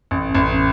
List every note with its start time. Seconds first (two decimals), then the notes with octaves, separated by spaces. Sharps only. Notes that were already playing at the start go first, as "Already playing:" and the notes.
0.11 A1
0.35 A1